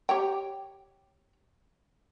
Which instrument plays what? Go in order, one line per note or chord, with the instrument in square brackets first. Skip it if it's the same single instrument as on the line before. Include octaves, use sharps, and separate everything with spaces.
[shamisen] G4 C#5 G5